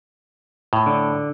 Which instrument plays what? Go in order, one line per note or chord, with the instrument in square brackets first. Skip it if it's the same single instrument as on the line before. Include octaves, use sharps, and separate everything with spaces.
[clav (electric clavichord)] A2
[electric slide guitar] D3